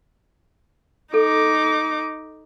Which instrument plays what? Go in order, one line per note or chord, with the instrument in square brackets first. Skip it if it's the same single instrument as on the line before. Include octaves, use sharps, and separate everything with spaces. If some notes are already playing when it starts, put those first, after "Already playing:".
[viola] D#4 D6 [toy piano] A4